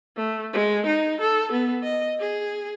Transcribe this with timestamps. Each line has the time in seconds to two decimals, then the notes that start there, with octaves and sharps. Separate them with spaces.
0.17 A3
0.53 G#3
0.86 D#4
1.20 A4
1.52 B3
1.83 D#5
2.20 G#4